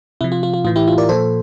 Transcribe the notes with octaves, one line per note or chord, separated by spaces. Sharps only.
C3 F3 E4
F4
F4
F4
A2 E3 F4
E4 G4
F4
A#4 D5
A#2 F3 A4 C5